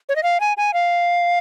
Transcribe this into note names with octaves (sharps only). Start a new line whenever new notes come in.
C#5
D#5
F5
G#5
G#5
F5